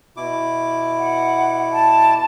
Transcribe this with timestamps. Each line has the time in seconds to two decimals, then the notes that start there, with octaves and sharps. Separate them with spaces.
0.17 B2 E4 D6
0.98 F#5
1.72 A5